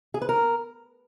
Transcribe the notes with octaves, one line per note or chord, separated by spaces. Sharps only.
G#4
B4
A#4